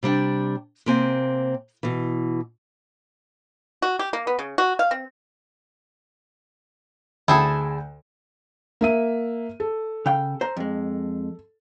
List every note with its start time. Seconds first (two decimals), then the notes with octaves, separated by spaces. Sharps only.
0.03 C3 G3 D4 G5
0.86 C3 A#3 C4 G#5
1.83 B2 E3
3.82 F#4
3.99 G4
4.13 A#3
4.27 B3
4.39 C#3
4.58 F#4
4.79 F5
4.91 C4
7.28 D2 E4 G#4 A4 G5 A5
8.81 A#3 E5 D#7
9.60 A4
10.06 C#3 F5 G5
10.41 C5 A#5
10.57 F2 G#3